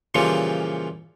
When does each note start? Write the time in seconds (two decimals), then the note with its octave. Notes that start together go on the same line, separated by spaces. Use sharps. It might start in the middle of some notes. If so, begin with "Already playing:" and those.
0.15 A#2 C#3 E3 F3 G3